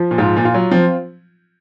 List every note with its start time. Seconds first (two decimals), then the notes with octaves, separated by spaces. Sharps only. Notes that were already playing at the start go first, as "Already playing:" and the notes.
Already playing: F3
0.11 A#2
0.18 G#2 F4
0.36 A#2
0.45 F4
0.54 F#3
0.71 F3 C4